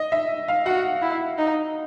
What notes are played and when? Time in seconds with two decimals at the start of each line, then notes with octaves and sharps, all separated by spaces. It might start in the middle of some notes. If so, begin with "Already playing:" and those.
Already playing: D#5
0.12 E5
0.48 F5
0.66 F#4 F#5
1.02 E4
1.38 D#4